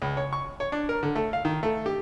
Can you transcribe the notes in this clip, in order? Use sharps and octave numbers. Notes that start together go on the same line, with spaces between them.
C#2
C#5
C#6
C#5
D4
A#4
D3
A3
F5
D#3
A3
G4